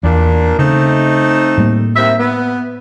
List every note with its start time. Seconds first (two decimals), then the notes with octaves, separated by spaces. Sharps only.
0.03 E2 A#2 D4
0.59 C#3 A3 C4 D#4
1.57 A2 G3 A#3
1.96 D#2 C4 E5
2.20 B3